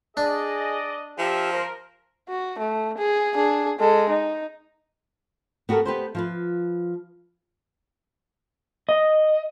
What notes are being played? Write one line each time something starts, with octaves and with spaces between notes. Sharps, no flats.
D4 G#4 D5 D#5
F3 F4 G4 A#4 E5
A#4 C5
F#4
A3
G#4
D4 G#4
G#3 A4
D#4
B3 F#4 G4 A4 A#4
B3 G4 B4 C5
F3 F4 B4
D#5